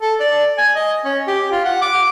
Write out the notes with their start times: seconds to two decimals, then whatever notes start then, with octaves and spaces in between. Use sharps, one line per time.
0.02 A4
0.20 D5
0.58 G#5
0.76 D#5
1.05 C#4
1.27 G4
1.51 F4
1.65 F#5
1.82 D6